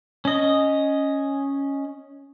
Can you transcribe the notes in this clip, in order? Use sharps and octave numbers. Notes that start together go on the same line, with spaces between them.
C#4 D#5